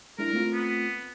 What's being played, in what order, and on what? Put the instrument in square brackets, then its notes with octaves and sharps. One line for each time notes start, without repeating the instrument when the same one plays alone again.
[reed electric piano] G#3 D4 E4 [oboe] A#4
[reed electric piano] A3 C4 F4
[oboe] B3